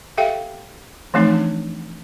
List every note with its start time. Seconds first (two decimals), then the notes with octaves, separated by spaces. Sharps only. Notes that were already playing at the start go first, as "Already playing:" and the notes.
0.17 G4 A4 E5 F5 G5
1.14 E3 F3 A3 C4 D#4
1.34 D4